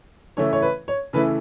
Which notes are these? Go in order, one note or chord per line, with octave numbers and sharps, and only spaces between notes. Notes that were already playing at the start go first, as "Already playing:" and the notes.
C#3 E3 A3 E4 C#5
C#5
B4
C#5
C#3 E3 A3 E4 B4